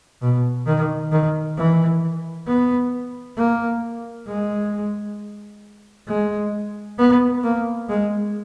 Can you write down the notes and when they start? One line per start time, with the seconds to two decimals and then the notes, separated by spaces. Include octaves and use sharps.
0.22 B2
0.66 D#3
1.12 D#3
1.57 E3
2.47 B3
3.37 A#3
4.27 G#3
6.08 G#3
6.99 B3
7.43 A#3
7.89 G#3